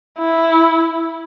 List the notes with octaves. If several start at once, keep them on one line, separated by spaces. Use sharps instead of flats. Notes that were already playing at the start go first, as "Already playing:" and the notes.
E4